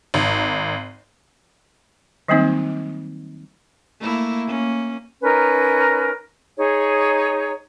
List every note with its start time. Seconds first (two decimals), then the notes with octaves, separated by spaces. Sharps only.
0.14 G#1
2.28 D#3 F#3 G3 A#3 C4 D#4
3.99 A3 A#3 E4
4.47 A#3 C#4
5.23 C#4 D#4 A#4 B4
6.58 D#4 G#4 C#5